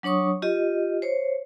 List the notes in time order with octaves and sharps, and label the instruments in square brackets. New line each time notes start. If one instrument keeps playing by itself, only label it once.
[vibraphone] F#3 D4 C#5 C#6 D#6
F4 G4 D#5
C5 C#5